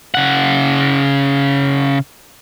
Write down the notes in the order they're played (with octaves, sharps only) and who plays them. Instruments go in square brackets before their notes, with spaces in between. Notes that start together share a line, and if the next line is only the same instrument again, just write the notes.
[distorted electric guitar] C#3 F#5